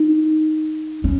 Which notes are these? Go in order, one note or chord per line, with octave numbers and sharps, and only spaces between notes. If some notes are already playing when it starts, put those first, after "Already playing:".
Already playing: D#4
C#4